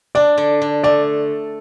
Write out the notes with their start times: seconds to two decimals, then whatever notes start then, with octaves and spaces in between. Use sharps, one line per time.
0.15 D4 D5
0.38 D3
0.62 D3
0.84 A3 D5